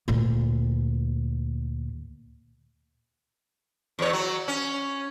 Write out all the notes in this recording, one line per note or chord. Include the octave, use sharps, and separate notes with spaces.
D2 A#2
E2 C#5
F#3
C#4